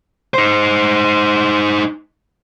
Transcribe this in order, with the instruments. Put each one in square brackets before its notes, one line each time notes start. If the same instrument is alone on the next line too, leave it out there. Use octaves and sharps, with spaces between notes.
[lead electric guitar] D#4 C5